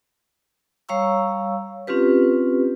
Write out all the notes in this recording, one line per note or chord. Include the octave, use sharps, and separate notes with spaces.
G3 C#5 F5 A#5 C#6 E6
C4 C#4 F4 G4 B4